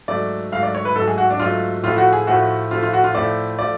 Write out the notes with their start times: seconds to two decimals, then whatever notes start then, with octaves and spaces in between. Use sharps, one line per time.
0.08 G#2 F#3 A3 D5
0.52 G#2 F#3 A3 F5
0.63 D5
0.75 C#5
0.85 B4
0.96 G#2 F#3 A3 A4
1.07 G#4
1.18 F#4
1.31 D4
1.40 G#2 F#3 A3 F4
1.83 A2 F3 A3 F4
1.98 F#4
2.13 G#4
2.27 A2 F3 A3 F#4
2.71 A2 F3 A3 F4
2.82 F4
2.93 F#4
3.04 F4
3.15 A2 F3 A3 D5
3.59 F3 A3 D5